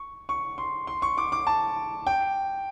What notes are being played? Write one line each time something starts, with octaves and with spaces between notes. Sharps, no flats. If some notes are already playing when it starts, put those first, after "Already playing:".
Already playing: C#6
C#6
C6
C6
C#6
D6
D6
A5
G5